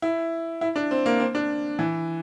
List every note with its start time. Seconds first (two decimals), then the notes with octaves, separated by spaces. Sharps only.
0.02 E4
0.61 E4
0.76 D4
0.91 C4
1.06 A#3
1.20 C4
1.35 D4
1.79 E3